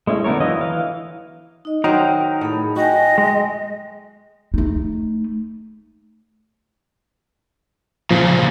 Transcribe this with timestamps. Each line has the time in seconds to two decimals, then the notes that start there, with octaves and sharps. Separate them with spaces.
0.07 G#3 A3 C#4 E4
0.24 D3 A3 B3 A#4 C#5
0.40 E3 F#3 E4 F4 D#5
0.61 E3 F5
1.65 D#4 D#5
1.84 D#3 F#3 D#4 A#4 C5 G5
2.41 A2 A3 G#4 B5
2.76 F#4 D#5 G5 G#5
3.18 G#3
4.54 A3 D#4
8.11 A#2 C#3 F3